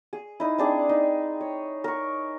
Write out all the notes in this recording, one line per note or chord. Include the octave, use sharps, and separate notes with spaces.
G#4
D#4 E4
C4 D4 G#4
D#4
C#5
A#4 C#6